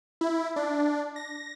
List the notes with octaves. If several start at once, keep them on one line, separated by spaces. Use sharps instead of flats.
E4
D4
A#6